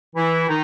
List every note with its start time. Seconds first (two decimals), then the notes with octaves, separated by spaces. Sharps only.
0.15 E3 E4
0.48 D#3 D#4